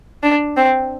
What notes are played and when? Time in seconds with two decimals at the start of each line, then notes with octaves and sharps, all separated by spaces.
0.23 D4
0.57 C4